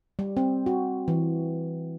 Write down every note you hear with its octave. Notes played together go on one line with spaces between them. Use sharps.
G3
C4
F#4
E3